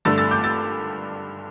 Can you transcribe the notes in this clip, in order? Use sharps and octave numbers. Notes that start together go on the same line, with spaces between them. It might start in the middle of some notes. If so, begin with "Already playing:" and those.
G2 D3 A3 D4 E6 A6
E6 A6
D6 G6
E6 A6